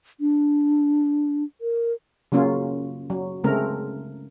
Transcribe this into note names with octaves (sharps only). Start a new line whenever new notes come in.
D4
A#4
C#3 F#3 A#3 C#4 F4
F#3
C#3 G#3 A3 C4 A#4